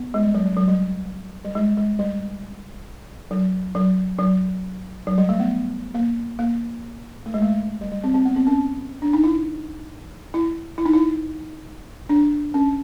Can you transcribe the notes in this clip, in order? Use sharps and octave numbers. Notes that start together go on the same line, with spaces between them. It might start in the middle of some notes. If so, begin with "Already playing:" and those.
Already playing: B3
G#3
G3
F#3
F#3
F#3
G3
G3
G#3
G#3
G3
F#3
F#3
F#3
F#3
G3
A3
B3
A#3
A#3
A3
G#3
A3
G3
G3
C4
C4
B3
C4
C#4
D4
D#4
E4
E4
E4
D#4
E4
D4
C#4